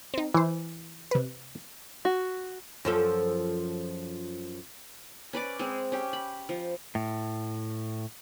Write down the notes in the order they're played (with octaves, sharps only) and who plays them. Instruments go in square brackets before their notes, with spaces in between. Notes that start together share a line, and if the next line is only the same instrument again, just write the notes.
[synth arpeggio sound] C4 D#4
[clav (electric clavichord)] E3 [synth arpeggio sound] E4 C5
[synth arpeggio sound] C3 B4
[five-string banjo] F#4
[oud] F#2 F3 A4
[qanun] C#4 B4 D5 D6
G#3 C4 G#4
C#4 G4
B5
F3
[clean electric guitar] A2